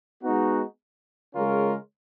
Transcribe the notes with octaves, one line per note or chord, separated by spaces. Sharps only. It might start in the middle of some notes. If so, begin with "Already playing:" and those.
G#3 B3 D#4 F#4
C#3 G#3 C#4 F4 A#4